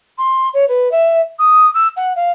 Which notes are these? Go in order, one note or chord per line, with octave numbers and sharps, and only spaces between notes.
C6
C#5
B4
E5
D#6
E6
F#5
F5